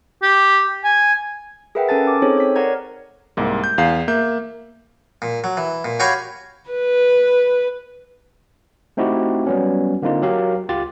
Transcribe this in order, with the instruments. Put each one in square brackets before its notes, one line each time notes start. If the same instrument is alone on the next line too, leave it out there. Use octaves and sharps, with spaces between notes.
[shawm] G4
G#5
[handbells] G#4 A#4 B4 E5 F#5 G5
C#4 A4 A#4 G#5 A5 A6
D6
C4 D#4 G#4 A4 C5 C#5
C#5 B6
A#4 C#5 D5 F#5 A#5 G#6
[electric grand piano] C2 G#2 A#3
G6
E2 F5 C7
A#3 E5 G6
[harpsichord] A#2
F#3
E3
A#2
F#4 G4 C#5 F5 G#5 B5
[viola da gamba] B4
[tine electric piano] A3 C4 D#4 E4 F#4 G4
F#3 G3 B3 C#4
D3 A#3 C4 D#4 F4
F#3 G4 A#4 F5
C#2 F4 G4 A6